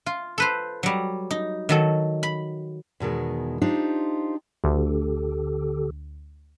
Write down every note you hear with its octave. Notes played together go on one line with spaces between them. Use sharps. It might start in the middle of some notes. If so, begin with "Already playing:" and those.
F4
A4 B4 C5
F#3 G3
D#4
D#3 F#3 A4
B5
E2 B2 D#3 G#3
D4 D#4 F4 G4 C5
D2 D3 G4 A4